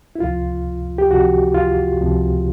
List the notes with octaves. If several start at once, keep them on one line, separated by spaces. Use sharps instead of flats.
E4
C#2 C3 F3 F4
G4
C#2 C3 F3 F#4
F4
C#2 C3 F3